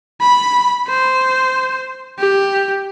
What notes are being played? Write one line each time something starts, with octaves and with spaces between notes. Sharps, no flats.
B5
C5
G4